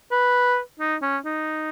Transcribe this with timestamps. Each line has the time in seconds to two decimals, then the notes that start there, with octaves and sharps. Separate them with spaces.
0.12 B4
0.80 D#4
1.02 C#4
1.25 D#4